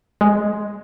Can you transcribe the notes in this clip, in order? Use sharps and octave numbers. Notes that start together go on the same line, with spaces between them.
G#3